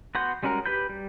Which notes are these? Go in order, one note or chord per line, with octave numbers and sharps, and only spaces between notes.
B3 F#4 F#5 C6 G6
G3 G#3 C#4 F#4 A#4
G4 B4 B5 G6
G3